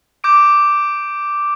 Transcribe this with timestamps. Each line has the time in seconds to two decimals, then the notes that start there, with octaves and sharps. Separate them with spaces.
0.24 D6 G6 D7